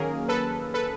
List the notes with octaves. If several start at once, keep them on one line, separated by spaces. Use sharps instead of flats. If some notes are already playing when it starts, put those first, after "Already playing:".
Already playing: D#3 F#3 A#3 C#4 G#4 A#4
A4 B4
A4 B4